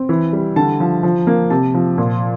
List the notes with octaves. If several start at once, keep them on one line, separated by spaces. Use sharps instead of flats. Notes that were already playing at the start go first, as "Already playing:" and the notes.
Already playing: C4
E3
G3
D3 A5
F3
F3
A#3
C3 A5
F3
A#2